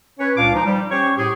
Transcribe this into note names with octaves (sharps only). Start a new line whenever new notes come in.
C#4 B4 C#5
C#2 A#2 D4 F5 D6
F3 D#4
G3
C#4 G4 C5 C#5 C#6
A2 G4 G#4